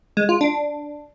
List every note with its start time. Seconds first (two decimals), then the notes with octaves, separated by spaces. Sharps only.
0.17 G#3
0.29 F4
0.41 D4